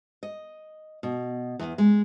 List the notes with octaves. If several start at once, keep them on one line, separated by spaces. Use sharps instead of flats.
D#5
B2
E2
G#3